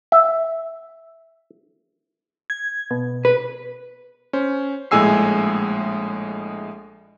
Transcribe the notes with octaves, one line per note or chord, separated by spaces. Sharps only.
E5
G#6
B2
B4
C#4 C5
A#1 A2 G#3 G#5 E6 C7